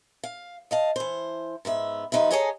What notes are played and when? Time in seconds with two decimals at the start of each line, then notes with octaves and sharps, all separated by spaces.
0.24 F5
0.71 D#5 F5 A5
0.96 E3 C5
1.65 G#2 B3 E5
2.12 D#2 F3 D#4 B4 E5
2.31 G#4 A4 C#5 D#5 G#5 A#5